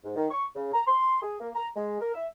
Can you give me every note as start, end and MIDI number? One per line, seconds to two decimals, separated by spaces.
0.04 0.15 44
0.16 0.27 51
0.31 0.46 85
0.56 0.71 49
0.74 0.82 82
0.87 1.22 84
1.22 1.36 68
1.40 1.49 58
1.54 1.68 82
1.76 2.00 56
2.01 2.11 70
2.15 2.27 76